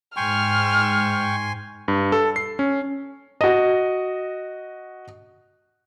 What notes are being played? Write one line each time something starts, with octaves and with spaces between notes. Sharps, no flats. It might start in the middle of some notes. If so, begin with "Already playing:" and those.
G#2 G5 G#5 C6 C#6 F6
G2
A4
C7
C#4
F#4 D#5